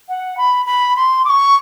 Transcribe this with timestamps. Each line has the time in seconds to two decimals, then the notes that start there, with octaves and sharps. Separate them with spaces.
0.09 F#5
0.37 B5
0.66 B5
0.96 C6
1.25 D6
1.30 C#6